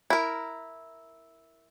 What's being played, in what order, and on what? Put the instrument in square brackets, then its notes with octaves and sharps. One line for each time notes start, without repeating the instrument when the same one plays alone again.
[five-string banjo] E4 A#4